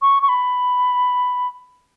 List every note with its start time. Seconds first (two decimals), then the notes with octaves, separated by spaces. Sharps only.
0.02 C#6
0.23 C#6
0.29 B5